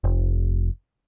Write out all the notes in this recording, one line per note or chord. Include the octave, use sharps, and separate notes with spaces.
F1